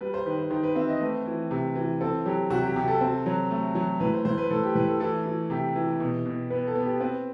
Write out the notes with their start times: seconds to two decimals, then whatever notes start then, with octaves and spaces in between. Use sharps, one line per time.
0.01 G3 B4
0.14 C5
0.26 D#3 B4
0.38 C5
0.50 D#3 C5
0.63 B4
0.76 C4 E5
0.89 D#5
1.00 A3 B4
1.26 E3
1.51 C3
1.76 E3
2.01 C4 A4
2.26 F#3 G4
2.50 C3 F#4
2.63 G4
2.76 C3 G4
2.88 A4
3.01 C4
3.26 F#3
3.51 A3
3.75 F#3
4.00 A2 B4
4.14 C5
4.25 A2 C5
4.38 B4
4.50 A2 A4
4.63 G4
4.75 A2 B4
4.88 A4
5.00 E3 A4
5.26 E3
5.50 C3 G4
5.76 E3
6.00 B2
6.25 B2
6.50 B3 B4
6.67 A4
6.75 B3
6.84 G4
7.00 C4 B4